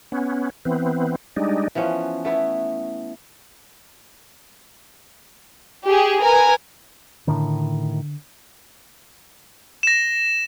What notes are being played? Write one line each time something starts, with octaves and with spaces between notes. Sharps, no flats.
B3 C#4
E3 B3 C4
G3 G#3 D4 D#4
E3 F3 B3 C#4
A3 B3 E4
G4 G#4
A#4 B4 G#5
A2 D3 D#3
A#6 E7